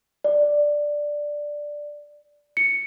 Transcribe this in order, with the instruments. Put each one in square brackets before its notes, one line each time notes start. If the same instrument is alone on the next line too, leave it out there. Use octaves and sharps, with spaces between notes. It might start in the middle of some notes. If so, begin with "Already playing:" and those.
[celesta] D5
C#7